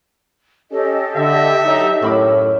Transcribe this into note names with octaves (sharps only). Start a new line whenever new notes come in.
C#4 G4 A4 D#5
D3 E5
F#3 D#4
F#2 A2 B5 D6